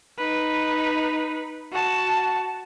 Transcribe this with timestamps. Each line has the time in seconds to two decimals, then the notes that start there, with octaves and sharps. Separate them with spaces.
0.18 D#4 B4
1.72 F#4 A5